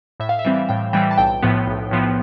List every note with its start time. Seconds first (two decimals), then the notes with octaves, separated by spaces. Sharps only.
0.20 A2 E5
0.29 F5
0.39 E5
0.45 E3 G3 C4
0.69 A2 G5
0.93 E3 G3 C4 G5
1.11 A5
1.18 B1 G5
1.43 A2 F3 B3
1.67 B1
1.91 A2 F3 B3